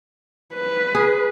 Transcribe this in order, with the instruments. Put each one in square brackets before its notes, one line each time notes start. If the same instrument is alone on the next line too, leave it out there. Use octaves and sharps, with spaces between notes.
[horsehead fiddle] B4
[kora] G#4